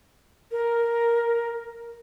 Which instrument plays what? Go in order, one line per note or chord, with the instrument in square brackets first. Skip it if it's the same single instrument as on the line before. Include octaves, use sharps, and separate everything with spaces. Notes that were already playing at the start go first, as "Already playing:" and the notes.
[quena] A#4